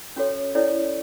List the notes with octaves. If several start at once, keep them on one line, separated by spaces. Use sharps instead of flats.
C#4 F#4 A4 C#5
C#4 E4 A4 C#5 D5